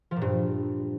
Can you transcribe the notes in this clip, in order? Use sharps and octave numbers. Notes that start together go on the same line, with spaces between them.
F3
A#2
G2